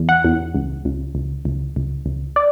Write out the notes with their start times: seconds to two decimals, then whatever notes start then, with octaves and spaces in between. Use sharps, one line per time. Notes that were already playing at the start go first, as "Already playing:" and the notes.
Already playing: E2
0.09 F#5
0.25 E2
0.54 C#2
0.85 C#2
1.15 C#2
1.45 C#2
1.76 C#2
2.06 C#2
2.36 D5